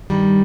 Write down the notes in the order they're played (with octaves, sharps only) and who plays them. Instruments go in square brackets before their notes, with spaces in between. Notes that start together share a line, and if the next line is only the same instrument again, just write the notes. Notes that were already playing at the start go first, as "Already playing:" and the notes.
[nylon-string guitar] G2 D#3 G3